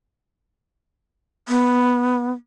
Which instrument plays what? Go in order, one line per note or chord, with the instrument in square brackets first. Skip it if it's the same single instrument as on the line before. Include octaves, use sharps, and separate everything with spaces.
[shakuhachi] B3